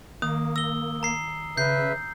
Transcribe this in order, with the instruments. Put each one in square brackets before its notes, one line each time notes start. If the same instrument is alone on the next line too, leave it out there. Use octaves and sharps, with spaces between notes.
[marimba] D#3 [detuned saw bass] A#3 [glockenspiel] D#6
[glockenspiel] E6 G7 [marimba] A#6
[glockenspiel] A#5 C7
[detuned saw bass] C#3 [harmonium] B4 E5 [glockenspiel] G6 C7